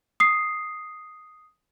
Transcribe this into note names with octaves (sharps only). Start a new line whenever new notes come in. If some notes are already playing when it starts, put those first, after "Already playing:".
D#6 C7